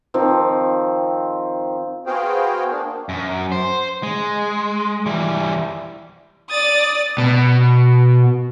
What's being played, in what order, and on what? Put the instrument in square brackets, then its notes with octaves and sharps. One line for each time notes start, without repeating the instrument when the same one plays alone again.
[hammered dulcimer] D#3 F3 C4
[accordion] B3 F#4 G#4 C5 F5 G5
A#3 D4
[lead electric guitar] F#2
C5
G#3
E3 G3
[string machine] D5 [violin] D#6 A6
[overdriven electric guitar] B2